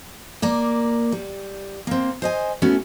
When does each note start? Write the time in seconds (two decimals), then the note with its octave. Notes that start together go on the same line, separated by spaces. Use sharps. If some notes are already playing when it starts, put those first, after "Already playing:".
0.42 A#3 A#4 D5
1.12 G3
1.87 A#3 C4
2.22 C5 D#5 G#5
2.62 A3 B3 C#4 E4 F#4